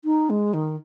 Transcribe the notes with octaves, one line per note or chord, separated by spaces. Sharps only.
D#4
G#3
D#3